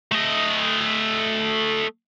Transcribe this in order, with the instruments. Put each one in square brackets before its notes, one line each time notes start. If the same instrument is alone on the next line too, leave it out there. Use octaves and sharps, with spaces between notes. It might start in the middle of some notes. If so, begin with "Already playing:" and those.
[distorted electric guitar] A3 D#5